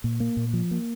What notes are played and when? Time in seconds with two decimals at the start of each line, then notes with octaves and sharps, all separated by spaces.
0.04 A#2
0.20 A#3
0.37 A#2
0.53 F3
0.71 A#3